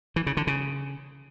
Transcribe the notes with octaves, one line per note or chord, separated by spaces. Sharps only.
E3
C#3
D3
C#3